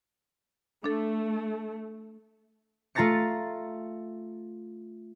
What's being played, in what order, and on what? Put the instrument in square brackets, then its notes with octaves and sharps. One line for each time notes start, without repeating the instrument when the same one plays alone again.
[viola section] A3 [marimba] D4 A4
[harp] A3 F4 A#5 A6 A#6 C#7